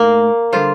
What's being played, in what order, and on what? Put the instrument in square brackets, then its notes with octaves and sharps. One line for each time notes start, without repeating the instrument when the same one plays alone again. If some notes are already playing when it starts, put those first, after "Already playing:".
Already playing: [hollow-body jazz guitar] A2 A3 D#4 [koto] A#3
[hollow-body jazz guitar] D3 G3 D4 A4 C5 [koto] F4